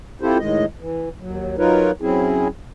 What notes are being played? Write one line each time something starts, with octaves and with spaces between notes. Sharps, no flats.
C4 E4 F4 G4 A4 C5
A2 D#3 G#3 D#5
E3
D#2 F#3
F#3 D#4 F4 A#4 B4 C#5
F#3 C4 C#4 E4 G#4